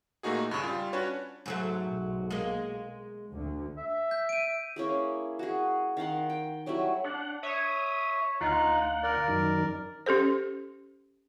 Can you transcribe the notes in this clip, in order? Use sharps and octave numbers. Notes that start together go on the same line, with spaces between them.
A#2 A3 A#3 D#4 F#4 G#4
G2 C#3
G3 F4
C#4 D4 F#4 B4 C#5
G#2 F#3 A3
B1
G#3 A#3
D2 D3
E5
G6
D7 D#7
A#3 C#4 E4 G#4
F#4 G#4
D#3 F5 F#5 C6
G5
F#3 G3 A3 E4
D4 F#5
C#5 E5 D#6
D2 D#4 F4 F#5
A#4 D5
F#2 D#3
C#4 G4 A4 C5